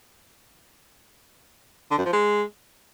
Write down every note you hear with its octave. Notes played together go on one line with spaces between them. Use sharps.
D3
F#2
F3
G#3